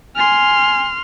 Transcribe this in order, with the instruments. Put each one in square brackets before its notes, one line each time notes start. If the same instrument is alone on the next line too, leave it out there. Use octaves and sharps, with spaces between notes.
[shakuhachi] G#5 [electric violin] C6 F6